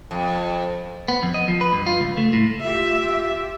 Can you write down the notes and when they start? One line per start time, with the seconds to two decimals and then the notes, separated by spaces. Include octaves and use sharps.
0.11 F2
1.08 B3
1.23 F2
1.34 D#5
1.48 F3
1.61 B4
1.73 G2
1.86 F4
2.00 C#2
2.17 A3
2.33 A2
2.63 F4 G4 E5